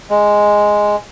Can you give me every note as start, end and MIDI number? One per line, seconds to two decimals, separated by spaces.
0.10 0.96 56